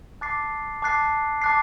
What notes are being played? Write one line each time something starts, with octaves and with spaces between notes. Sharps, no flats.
A5 D6 F#6 A6 C7
A5 D6 F#6 A6 C7
A5 D6 F#6 A6 C7